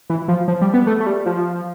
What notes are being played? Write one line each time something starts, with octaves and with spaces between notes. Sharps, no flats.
E3
F3
F3
G3
B3
A3
A3
G3
F3